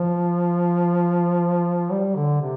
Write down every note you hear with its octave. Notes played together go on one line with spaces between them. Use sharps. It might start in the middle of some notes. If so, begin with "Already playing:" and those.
Already playing: F3
G3
D3
C3